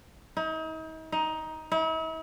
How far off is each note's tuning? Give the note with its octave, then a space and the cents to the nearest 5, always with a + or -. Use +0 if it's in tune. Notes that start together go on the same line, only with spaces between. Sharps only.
D#4 +40
D#4 +15
E4 -45